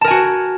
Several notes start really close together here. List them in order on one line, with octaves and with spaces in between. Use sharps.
A5 A#4 G#5 F#4